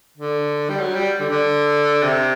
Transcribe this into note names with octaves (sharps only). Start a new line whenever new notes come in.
D3
G3
F#3
G3
D3
D3
C3